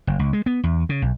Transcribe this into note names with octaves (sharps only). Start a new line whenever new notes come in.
F#1
C#2
G#3
B3
E2
C#3
B1